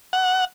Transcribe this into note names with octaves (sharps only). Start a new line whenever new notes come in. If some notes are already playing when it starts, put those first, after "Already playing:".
F#5